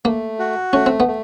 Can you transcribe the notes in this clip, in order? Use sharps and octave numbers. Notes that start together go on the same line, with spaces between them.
A3 A#3
F#4
A3 C#4
C4
B3
A3